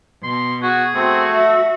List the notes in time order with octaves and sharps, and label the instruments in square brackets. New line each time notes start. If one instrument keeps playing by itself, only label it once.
[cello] B2 [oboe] C6
[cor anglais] F#4 [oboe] G#4
[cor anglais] A3 [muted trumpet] C4 [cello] F#4
[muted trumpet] E5